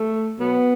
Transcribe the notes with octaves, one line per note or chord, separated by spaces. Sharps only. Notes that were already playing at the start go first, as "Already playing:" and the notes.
Already playing: A3
B2 F#3 B3